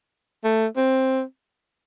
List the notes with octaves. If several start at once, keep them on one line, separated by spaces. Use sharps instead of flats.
A3
C4